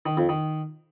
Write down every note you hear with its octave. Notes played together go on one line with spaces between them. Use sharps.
D#3
F2
D#3